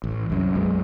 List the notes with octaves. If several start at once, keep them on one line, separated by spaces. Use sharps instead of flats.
A1
C2 F#2
B1 F#2 G#3